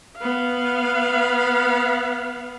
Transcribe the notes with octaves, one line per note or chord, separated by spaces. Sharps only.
B3 F5